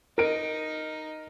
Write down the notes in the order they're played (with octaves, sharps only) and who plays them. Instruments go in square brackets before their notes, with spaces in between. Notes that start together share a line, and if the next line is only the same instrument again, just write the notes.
[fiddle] D#4 D#5 [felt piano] A#4 D7